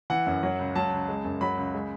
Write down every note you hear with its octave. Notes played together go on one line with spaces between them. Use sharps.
E3 F#5
F#2
F#3
C#2
F#3 A5
C#2
G#3
F#2
F#3 B5
C#2
G#3